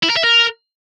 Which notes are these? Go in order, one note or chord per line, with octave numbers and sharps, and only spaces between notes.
E4
A#4
E5
A#4